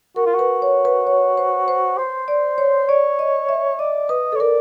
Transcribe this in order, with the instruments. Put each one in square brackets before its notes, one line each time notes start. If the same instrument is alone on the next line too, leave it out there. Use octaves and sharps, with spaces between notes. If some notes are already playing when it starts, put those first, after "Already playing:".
[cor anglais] F#4 [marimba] A#4
[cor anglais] F4
[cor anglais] F#4 [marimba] B4
[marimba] C#5
B4
C#5
C5
C5
[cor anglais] C5
[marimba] D5
C#5
[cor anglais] C#5 [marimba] D5
[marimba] D#5
E5
[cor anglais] D5 [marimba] D#5
[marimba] B4 [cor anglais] D#5
[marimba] A4
[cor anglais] C#5
[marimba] A#4 [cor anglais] D5